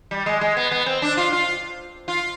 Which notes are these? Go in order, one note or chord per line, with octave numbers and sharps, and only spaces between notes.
G3
G#3
G#3
B3
B3
C4
D4
F4
F4
F4